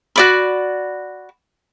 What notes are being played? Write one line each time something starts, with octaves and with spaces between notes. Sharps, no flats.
F#4 D5 B5